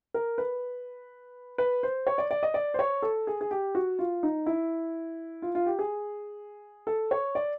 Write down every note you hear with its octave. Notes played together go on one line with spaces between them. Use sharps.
A#4
B4
B4
C5
C#5
D5
D5
D#5
D5
C5
C#5
A4
G#4
G#4
G4
F#4
F4
D#4
E4
F4
F4
G4
G#4
A4
C#5
D5